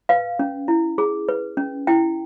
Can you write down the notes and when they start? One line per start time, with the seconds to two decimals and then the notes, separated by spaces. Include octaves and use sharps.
0.09 B4 F5
0.39 C#4
0.68 E4
0.98 G#4
1.29 B4
1.57 C#4
1.87 E4 G5